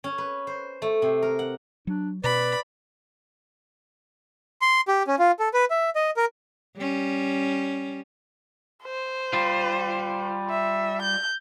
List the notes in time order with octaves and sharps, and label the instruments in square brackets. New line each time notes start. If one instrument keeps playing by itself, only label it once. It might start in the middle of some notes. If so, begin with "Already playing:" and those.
[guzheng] C#4
B4
C5
A3
C3
A#4
F#5
[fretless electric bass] F#3 [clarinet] D4
[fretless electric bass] B2 [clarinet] B4 [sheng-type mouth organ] D5 [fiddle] B5
[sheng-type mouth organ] C6
G4
C#4
F4
A4
B4
E5
D#5
A#4
[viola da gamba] G3 C#4
[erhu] C5
[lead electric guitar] G3 F4
[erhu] E5
G6